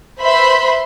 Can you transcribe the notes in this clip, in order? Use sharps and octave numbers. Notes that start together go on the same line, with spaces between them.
B4 C5 E5 B5 C6